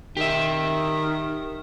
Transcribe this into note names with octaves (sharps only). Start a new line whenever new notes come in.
D#3 G4 E5